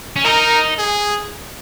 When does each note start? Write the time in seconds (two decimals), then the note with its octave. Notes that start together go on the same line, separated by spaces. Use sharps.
0.16 C#4
0.25 D#4 A#4
0.78 G#4